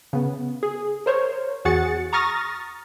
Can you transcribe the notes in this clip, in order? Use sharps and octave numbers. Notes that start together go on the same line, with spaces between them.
C#3 B3
G#4
A#4 C5 C#5
E2 F#4 G#4 F#5 A6 C#7
A#5 C#6 D#6 F6 A6 A#6